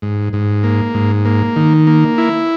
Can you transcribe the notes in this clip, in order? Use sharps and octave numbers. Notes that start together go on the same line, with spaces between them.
G#2
G#2
A#3
G#2
A#3
D#3
A#3
E4